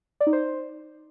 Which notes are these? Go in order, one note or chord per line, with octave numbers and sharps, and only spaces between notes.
D5
D#4
C5